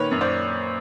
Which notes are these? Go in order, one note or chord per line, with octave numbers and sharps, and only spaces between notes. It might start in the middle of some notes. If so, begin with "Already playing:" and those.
Already playing: A#2 D#3 B4 C#5
F#2
C5 D5